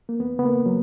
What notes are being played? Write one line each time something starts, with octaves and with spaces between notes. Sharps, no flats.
A#3
E2 B3
C#3 B3
A#3
F#3